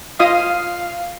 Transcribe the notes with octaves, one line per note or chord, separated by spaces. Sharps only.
F4 D#5 F5 D#6